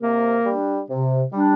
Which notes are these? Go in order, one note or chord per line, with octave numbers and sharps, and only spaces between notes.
C3 A#3 A#4
G3 D4
C3
G3 D4